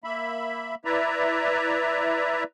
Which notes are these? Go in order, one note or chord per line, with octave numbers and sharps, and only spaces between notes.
A#3 E5 B5
E4 B4 D5 E5 A#5